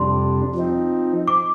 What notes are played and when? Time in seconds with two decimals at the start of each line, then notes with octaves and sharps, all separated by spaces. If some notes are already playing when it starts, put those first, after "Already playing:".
Already playing: F2 C3 G3 D4 C6
0.55 F3 C4 D#4
1.28 D6